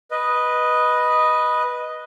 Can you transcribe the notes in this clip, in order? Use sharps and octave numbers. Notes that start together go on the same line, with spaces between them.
B4 D#5